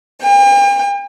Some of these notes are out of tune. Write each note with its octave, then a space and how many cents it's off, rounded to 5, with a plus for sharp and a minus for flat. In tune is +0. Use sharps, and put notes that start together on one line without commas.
G5 +45